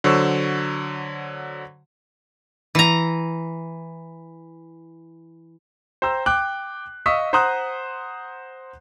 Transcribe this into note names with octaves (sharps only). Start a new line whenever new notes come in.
D3 F#3 C5 C#6 E6
E3 A#5
C5 G5 A#5 E6
G5 D6 F#6
D#5 F5 C#6 D#6 E6 B6
C5 F#5 A#5 C6 D#6 F#6